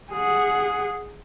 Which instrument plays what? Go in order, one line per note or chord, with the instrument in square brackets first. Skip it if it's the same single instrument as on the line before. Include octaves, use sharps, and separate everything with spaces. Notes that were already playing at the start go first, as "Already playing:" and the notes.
[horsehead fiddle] G#4 F#5